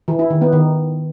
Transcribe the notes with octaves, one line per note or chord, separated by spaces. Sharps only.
E3
E4
D#3
B3
D#3